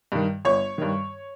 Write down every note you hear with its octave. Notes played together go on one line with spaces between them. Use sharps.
G2 D#3
G1 C#5
G2 D#3